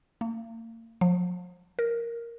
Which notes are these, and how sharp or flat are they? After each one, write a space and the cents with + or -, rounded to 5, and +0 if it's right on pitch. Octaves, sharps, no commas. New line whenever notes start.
A#3 -40
F3 +35
A#4 +0